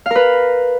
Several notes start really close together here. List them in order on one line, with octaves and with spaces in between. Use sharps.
F5 A#4 B4